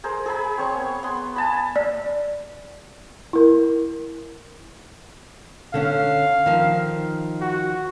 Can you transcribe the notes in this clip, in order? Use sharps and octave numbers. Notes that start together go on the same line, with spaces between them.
G#4 A#4 C5
G#4 A#4 B5
C4 C#5 C#6
B3
B3 C6
G#5 A5 B5
D5
E4 A#4
D3 C#4 F5
D#3 F3
F#4